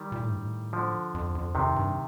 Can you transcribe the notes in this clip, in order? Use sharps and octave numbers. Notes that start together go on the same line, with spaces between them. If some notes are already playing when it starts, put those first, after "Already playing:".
Already playing: D#3 G3
A#2
A2
G2
A2
D3 F3
F2
F2
F2 C3 D#3
G2